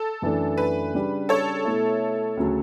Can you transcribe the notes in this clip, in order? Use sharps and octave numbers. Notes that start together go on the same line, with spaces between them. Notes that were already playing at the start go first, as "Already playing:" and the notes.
Already playing: A4
F#2 E3 A3 D4
B4
C#3 G3 D4
A4 C#5
B2 A3 E4
D2 C#3 F#3